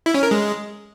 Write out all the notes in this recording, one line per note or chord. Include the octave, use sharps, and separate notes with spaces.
E4
C#4
A#4
G#3